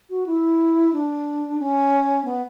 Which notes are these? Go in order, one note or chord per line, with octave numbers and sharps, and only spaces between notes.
F#4
E4
D4
C#4
B3